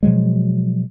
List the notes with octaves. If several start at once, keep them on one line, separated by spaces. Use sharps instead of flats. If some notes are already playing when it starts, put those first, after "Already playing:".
B2 F3 F#3 G#3